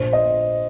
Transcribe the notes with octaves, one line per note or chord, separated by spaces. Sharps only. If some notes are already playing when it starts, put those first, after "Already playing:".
Already playing: A#1 C5
D#5